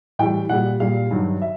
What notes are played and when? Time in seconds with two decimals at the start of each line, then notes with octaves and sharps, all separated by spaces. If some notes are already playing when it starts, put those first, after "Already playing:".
0.19 A2 E3 G3 G5
0.49 A#2 G3 F#5
0.80 A#2 G3 F5
1.11 G2 D#3 F#3
1.42 E5